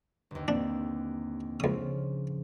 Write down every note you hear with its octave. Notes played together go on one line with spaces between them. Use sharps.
G1 D#2
A#3 C4 D4
C#2 C#3 F3 D#6